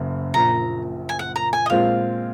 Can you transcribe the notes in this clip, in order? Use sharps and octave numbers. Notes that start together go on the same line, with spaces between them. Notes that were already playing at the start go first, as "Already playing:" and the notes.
Already playing: F#1 F#2 C#3
A#1 A#2 F3 A#5
G#5
F#5
A#5
G#5
D#5
A#2 G#3 C4 F4 F5